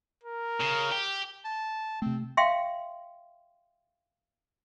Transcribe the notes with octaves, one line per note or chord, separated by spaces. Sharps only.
A#4
C#3
G4
A5
C3 A3 C4
E5 F5 G5 C6